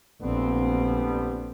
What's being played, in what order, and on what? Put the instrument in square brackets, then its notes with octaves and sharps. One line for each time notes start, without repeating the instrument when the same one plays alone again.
[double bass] A#1 C4 [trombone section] D3 G3 B3